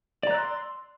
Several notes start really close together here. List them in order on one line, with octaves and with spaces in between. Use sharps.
D5 A#5 F#6 E6 C6